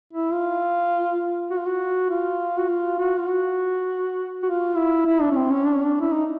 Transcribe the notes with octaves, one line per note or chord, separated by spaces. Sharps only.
E4
F4
F#4
F4
F#4
F4
F#4
F4
F#4
F4
F#4
F#4
F4
E4
E4
D4
C#4
C4
C#4
D4
C#4
D4
E4
D#4